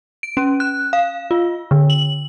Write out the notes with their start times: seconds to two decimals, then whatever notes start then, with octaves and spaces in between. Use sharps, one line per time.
0.23 D7
0.37 C#4
0.60 F#6
0.93 F5
1.31 F4
1.71 D3
1.90 F#7